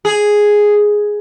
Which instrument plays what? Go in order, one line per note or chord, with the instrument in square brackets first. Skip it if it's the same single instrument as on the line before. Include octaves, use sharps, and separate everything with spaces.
[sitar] G#4